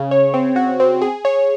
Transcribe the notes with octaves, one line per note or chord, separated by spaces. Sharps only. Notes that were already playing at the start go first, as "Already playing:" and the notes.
Already playing: C#3
C#5
C4
F#4
C4
G#4
C#5